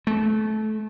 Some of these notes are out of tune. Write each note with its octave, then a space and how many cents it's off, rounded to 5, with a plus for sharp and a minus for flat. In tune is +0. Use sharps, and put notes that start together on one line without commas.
A3 -25